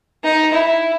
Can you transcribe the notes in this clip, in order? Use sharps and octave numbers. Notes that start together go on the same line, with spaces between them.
D#4
E4